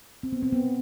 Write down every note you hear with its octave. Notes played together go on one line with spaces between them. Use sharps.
C4
B3
C4
B3